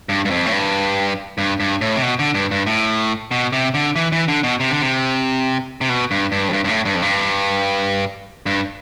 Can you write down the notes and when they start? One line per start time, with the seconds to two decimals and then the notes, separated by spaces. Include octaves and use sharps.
0.09 G2
0.25 G2
0.31 F2
0.46 A2
0.52 G2
1.38 G2
1.60 G2
1.81 A2
1.96 C3
2.02 B2
2.19 D3
2.34 G2
2.51 G2
2.67 A2
3.31 B2
3.53 C3
3.74 D3
3.96 E3
4.12 E3
4.28 D3
4.43 B2
4.60 C3
4.71 D3
4.81 C3
5.81 C3
5.89 B2
6.11 G2
6.32 G2
6.48 F2
6.53 G2
6.64 G2
6.69 A2
6.85 G2
6.95 F2
7.02 G2
8.46 G2